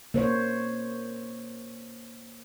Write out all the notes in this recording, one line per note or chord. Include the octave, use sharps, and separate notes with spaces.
A#3 C5 C#5